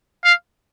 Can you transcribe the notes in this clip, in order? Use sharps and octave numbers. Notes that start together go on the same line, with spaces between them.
F5